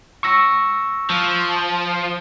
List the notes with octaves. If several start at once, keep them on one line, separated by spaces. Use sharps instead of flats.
C#6 E6 A#6
F3